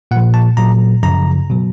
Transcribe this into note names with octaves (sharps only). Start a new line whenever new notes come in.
A#2 F#5
F3
A5
A#2 F#3 A#5
F#2 C#3 F3 A#5
B2 F#3